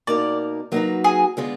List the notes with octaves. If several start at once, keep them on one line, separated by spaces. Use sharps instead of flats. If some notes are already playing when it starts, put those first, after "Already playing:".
B2 A#3 D#4 A#4 D5
F#3 A#3 D#4 F#4 B4
G#4
D3 G#3 B3 F4 G#4